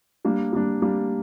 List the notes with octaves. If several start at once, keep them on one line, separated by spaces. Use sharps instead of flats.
G3 A#3 D4
G3 A#3 D4
G3 A#3 D4